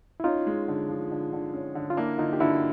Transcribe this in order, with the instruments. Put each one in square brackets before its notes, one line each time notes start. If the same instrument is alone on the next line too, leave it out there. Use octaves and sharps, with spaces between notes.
[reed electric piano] E4
[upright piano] C#4 [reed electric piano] D#4 F4
[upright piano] G#3
D3
F3
D3
D3
C#4
D3
[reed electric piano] F4
[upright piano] A#3 [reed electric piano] D4 E4
[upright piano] D3 [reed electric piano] D#4 F4
[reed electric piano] G4
[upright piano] D3 [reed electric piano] E4 F#4